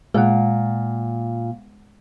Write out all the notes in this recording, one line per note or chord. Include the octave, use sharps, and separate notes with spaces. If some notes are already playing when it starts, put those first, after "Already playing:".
A#2 G#3 F#5